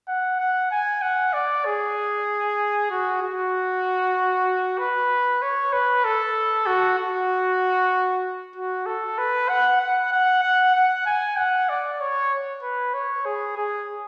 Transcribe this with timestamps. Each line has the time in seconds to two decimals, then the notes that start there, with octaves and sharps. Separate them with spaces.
0.08 F#5
0.40 F#5
0.71 G#5
1.02 F#5
1.33 D5
1.65 G#4
2.90 F#4
3.22 F#4
4.78 B4
5.42 C#5
5.73 B4
6.04 A4
6.66 F#4
6.98 F#4
8.56 F#4
8.86 A4
9.18 B4
9.49 F#5
9.81 F#5
10.12 F#5
10.43 F#5
10.75 F#5
11.06 G#5
11.37 F#5
11.69 D5
12.00 C#5
12.62 B4
12.94 C#5
13.25 G#4
13.57 G#4